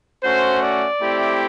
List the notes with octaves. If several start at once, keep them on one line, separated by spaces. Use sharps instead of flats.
A3 C#4 F#4 C5
D5
A3 C4 E4 G4